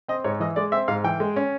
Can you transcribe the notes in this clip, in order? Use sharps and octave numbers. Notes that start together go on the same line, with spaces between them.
C4 D#5
G#2 C#5
E3 D#5
G#3 D5
C4 E5
G#2 F5
E3 G5
G#3
C#4